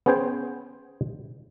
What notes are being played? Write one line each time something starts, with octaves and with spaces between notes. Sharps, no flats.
B3 C#4 G#4 C5 G5 G#5